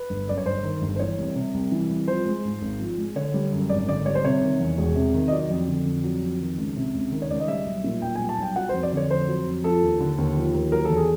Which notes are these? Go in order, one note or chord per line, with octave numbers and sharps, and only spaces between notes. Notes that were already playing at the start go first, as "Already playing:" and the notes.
Already playing: B4
G1
F#2 D5
C#5
G1 C5
D#3
G1
C5
E3 C#5
C2
C3
C2
E3
C2
F3 C5
G#3
G#2
G#1
F3
G#3
D3 C#5
G3
F#2
G#1 D5
D3 D5
G3 C#5
C5
C3 C#5
D#3
E2
E1
C3
D#3
D#5
F#3 D5
F2
D3
F2
F#3
F2
D#3
C#2
C3
C#2
D#3
C#5
C#2 D5
D#5
G3 E5
B1
A#2
B1 G5
G#5
G3
A5
B1 G5
F#3 F#5
C5
F2
D5
D3 C#5
F2 C5
F#3
F2
F3 A4
D#2
D3
D#2
F3
D#2
F#3 A#4
A4
E2
G#4